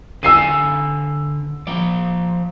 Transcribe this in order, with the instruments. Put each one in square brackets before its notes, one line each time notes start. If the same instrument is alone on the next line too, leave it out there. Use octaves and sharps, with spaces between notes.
[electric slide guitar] D3 F5 G#5 [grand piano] E6 C7 D#7
[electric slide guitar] F3 D5